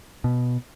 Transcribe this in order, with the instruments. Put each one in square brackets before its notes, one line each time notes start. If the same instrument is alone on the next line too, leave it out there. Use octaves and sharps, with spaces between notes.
[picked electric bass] B2